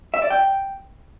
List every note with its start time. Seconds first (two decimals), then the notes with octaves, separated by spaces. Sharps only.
0.14 E5
0.22 D5
0.30 G5